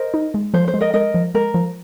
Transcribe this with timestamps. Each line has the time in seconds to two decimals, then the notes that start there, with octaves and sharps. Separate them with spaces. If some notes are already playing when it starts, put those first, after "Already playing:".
Already playing: A#4 C5 D#5
0.14 D#4
0.34 G#3
0.54 F3 C5
0.68 C5
0.74 G#3
0.80 A#4 D#5
0.94 G#3 A#4 D#5
1.14 F3
1.35 G#3 A#4
1.54 F3